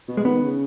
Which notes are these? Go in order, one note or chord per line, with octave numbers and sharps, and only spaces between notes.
B2
G#3
D#3 B3
C#3